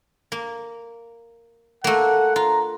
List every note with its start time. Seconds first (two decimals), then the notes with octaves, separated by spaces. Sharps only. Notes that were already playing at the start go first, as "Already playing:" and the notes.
0.32 A#3
1.84 A3 A#3 F#5
2.36 F4 A#5